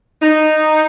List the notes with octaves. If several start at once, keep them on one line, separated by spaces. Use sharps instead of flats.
D#4